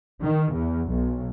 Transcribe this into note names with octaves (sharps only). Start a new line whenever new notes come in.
D#3
E2
B1